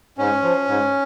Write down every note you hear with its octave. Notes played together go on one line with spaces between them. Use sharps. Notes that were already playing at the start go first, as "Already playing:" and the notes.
G#2 C#4
F3
G#2